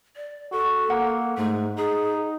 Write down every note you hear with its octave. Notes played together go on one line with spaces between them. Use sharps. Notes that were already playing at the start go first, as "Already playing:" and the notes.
D5
F#4 A4
A#3 F#5
G#2 A3
D#4 G#4